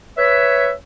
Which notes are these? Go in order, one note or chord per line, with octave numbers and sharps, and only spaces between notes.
B4 C#5 E5